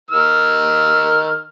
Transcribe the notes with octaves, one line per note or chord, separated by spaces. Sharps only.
D#3 E6 F6